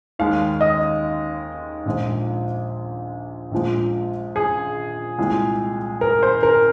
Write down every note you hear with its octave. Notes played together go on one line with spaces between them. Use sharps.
D#2 D#3 G#3 F5
D#5
A#1 A#2 F3 G#3
A#1 A#2 F3 G#3
G#4
C2 A#2 G#3
A#4
C5
A#4